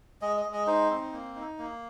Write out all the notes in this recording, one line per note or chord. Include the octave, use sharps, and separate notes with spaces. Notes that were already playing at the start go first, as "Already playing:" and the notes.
G#3 D#5
D#5
G#3
D#5
D#4 C5
C4
A#3
D#4
A#3